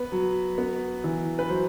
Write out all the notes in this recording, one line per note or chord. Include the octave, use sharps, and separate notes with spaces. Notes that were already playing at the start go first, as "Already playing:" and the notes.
Already playing: B3 B4
F#3
B3
E3
B4
F#3 C5